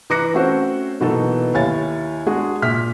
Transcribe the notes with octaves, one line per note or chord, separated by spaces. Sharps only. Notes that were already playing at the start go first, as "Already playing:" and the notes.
E3 A#5 D6 F#6 A#6 C#7
A3 C4 C#4 F#4 C5
B2 E3 F#3 A#3 D#4 A4
D#2 E4 C#5 F5 G#5 A6
G#3 D4 F#4 G#4
A#2 E5 F6 B6